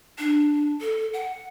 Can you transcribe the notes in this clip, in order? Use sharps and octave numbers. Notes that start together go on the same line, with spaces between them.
D4
A4
F#5